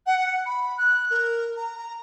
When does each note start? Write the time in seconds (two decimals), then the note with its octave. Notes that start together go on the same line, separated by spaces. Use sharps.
0.06 F#5
0.46 B5
0.77 F#6
1.10 A#4
1.56 A#5
1.78 A#5